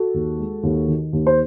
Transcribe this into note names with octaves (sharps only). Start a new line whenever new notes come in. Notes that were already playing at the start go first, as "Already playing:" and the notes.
Already playing: F#4 A4
D#2
G#3
D#2
D#3
D#2
C5